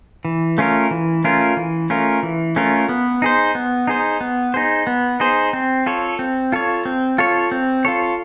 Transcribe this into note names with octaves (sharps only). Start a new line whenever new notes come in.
E3
A3 C#4 F4 A#4
E3
A3 C#4 F4 A#4
E3
A3 C#4 F4 A#4
E3
A3 C#4 F4 A#4
B3
D#4 G#4 C5
B3
D#4 G#4 C5
B3
D#4 G#4 C5
B3
D#4 G#4 C5
C4
F4 A4 C#5
C4
F4 A4 C#5
C4
F4 A4 C#5
C4
F4 A4 C#5